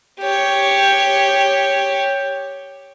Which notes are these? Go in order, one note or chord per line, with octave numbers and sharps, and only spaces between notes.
G4 C#5